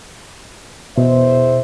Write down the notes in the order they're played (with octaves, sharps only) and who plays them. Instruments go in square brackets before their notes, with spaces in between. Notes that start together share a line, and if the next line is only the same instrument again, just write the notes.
[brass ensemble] E2 C5 E5 [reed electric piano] B2